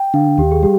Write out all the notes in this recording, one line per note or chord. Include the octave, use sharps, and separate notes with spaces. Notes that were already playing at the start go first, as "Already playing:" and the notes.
Already playing: G5
D3 F5
D#2 G4
G#4
G3 G4